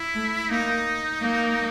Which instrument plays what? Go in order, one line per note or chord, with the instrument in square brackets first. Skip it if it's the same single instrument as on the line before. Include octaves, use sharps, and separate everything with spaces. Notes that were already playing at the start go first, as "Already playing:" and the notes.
Already playing: [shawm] E4
[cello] A3
[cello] A#3 [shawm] D#4
[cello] A#3